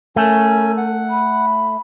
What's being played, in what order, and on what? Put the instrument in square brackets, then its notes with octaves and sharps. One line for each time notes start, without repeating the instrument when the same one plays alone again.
[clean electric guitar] A3 [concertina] C#4 G#5 [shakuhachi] A#4
[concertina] F#5
[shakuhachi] B5